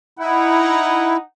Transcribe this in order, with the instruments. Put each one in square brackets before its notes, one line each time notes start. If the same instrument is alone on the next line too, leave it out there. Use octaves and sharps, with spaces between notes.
[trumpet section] D#4 F#5 [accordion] E4